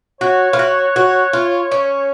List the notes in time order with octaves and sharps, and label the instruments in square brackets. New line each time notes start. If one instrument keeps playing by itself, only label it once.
[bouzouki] F#4 [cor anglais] C#5
[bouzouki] F4
F#4
F#4
F4
C#4